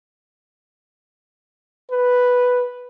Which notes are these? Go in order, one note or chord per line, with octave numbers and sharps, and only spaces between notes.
B4